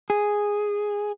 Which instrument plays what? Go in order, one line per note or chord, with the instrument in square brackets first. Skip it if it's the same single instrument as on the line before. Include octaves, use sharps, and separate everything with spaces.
[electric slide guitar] G#4